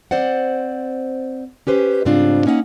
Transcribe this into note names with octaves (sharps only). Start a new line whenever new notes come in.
C4 C5 D5 F#5
C#4 G4 B4 C5
G#2 C#3 G3 C4 D4 F4
A#3 C#4 D#4 E5 F#5